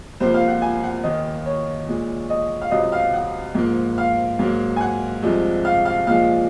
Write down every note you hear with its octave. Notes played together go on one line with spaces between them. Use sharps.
C#2 C3 F3 A#3 C5
F5
F#5
G#5
F#5
D#2 D#3 A#3 D#5
C#5
A#2 G#3
D#5
F5
C#2 C3 F#3 D#5
F5
F#5
G#2 F3 A#3
F5
G#2 F#3 A#3
G#5
F#5
C2 C3 F3 G#3
F5
F5
A#2 F3 G#3 F5